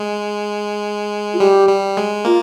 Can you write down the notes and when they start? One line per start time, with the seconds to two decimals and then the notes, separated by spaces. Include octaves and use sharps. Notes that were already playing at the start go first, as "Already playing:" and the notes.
Already playing: G#3
1.34 F4
1.40 G3 G4
1.69 G3
1.97 G#3
2.25 A#3 F4